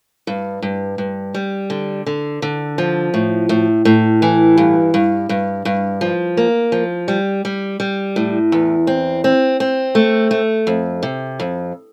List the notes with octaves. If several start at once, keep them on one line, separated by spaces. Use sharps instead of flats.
G2
G2
G2
G3
D3
D3
D3
F3
A2
A2
A2
E3
G2
G2
G2
G2
F3
A#3
F3
G3
G3
G3
A2
E2
C4
C4
C4
A3
A3
F2
C3
F2